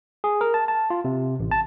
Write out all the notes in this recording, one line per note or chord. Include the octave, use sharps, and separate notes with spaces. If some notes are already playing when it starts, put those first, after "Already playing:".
G#4
A#4
A5
A5
F4
C3
A1
A5